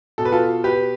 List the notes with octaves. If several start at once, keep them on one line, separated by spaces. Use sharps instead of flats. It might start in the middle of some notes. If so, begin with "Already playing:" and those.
B2 A4
B4
F4 A4
G4 B4